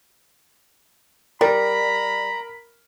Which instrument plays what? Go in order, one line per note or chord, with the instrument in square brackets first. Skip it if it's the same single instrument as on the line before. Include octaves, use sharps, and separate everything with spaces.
[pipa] G3 [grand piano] A#4 [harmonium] A#5 [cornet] B5